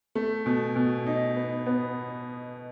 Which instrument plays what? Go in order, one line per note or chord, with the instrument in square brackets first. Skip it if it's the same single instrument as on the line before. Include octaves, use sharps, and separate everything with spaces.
[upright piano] A3
B2
B2
D#4
B3
B3